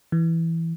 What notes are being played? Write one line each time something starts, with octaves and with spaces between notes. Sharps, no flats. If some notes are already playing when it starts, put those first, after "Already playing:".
E3